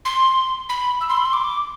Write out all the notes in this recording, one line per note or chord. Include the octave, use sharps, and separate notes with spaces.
C6
B5
E6
C6
B5
C6
D6